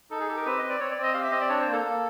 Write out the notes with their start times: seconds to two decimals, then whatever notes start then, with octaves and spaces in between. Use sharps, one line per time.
0.10 D#4 A4
0.20 G#4
0.28 G4 A4
0.37 A#4
0.46 C4 B4
0.58 C4 D#5
0.69 D5
0.80 C4 C#5
0.91 D5
0.97 C4
1.03 D#5
1.14 G4 F5
1.23 E5
1.31 C4 D#5
1.41 D5
1.49 D4 C#5
1.61 A#3 C5
1.73 A4
1.84 A#3